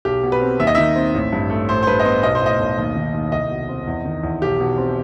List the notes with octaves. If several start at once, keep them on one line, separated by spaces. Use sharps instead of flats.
B1 G4
B2
B4
C4
D#2 E5
D#5
D#3 E5
C4
A1
G2
A3
A1 C5
C5
G2 B4
D#5
B3 C5
B1 D#5
C5
A2 D#5
B1
D#2
D#3
D#2
C2 D#5
B2
C4
E2
D#3
E2
B1 G4
B2
C4